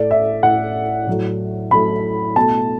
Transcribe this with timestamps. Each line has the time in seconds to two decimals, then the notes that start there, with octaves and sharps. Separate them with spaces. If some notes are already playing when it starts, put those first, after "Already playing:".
Already playing: A2 A3 D5
0.11 E5
0.43 A2 A3 F#5
1.07 A2 F#3 A3
1.71 A2 F#3 A3 B5
2.36 B2 A3 A5